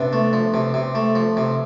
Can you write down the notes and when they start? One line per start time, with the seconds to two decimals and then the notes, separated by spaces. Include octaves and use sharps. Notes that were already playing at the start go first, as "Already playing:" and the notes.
Already playing: C3 B3 D4
0.13 A3
0.33 F3
0.54 C3
0.74 C3
0.95 A3
1.15 F3
1.37 C3